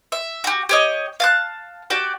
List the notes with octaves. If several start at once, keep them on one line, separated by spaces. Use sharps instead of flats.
E5
F#4 G4
G4 C#5 D#5
F5 A5 F#6
F#4 G4 D5